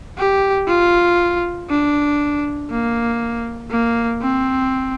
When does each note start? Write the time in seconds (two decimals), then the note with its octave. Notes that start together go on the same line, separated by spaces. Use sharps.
0.18 G4
0.68 F4
1.69 D4
2.71 A#3
3.71 A#3
4.22 C4